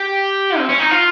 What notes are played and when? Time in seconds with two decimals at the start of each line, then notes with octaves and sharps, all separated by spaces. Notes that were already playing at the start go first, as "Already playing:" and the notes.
Already playing: G4
0.58 C4
0.69 C#4
0.79 D#4
0.91 F4